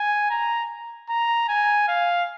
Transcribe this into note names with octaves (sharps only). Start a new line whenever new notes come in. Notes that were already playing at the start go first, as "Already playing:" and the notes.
Already playing: G#5
A#5
A#5
G#5
F5